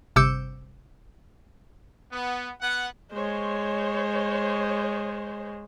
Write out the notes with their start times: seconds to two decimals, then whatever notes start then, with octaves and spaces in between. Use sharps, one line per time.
0.16 G1 C3 D6 E6 G6 C#7
2.12 B3
2.61 B3 F#5
3.13 G#3 C5 C#5